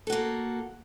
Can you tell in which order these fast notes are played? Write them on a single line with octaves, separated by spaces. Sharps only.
A4 F#4 A#3